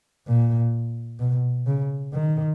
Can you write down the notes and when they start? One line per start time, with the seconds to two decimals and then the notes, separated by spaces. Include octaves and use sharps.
0.27 A#2
1.20 B2
1.67 C#3
2.13 D#3